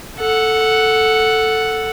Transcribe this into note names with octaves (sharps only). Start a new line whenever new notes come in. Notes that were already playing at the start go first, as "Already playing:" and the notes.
A4 F#5